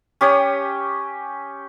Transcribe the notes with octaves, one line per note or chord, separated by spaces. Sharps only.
C#4 G4 C#5 D#6